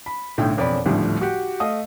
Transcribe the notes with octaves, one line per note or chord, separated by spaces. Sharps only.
B5
B1 A2 D3 G5
E1 F2 C#5 D5 B5
G#1 D2 A2 F3 G3
F#4 G4
A3 D#5 F5 D#6